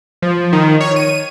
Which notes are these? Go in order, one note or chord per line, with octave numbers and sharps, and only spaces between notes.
F3
D#3
C#5
D#7